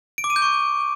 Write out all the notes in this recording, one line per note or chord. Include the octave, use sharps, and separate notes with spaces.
D7
D6
D#7
G6
C#6